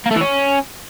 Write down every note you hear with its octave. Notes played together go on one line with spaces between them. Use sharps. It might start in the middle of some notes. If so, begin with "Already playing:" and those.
A#3
A3
E3
C#4